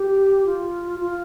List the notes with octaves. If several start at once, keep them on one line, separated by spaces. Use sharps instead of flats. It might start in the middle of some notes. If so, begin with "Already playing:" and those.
Already playing: G4
F4
F4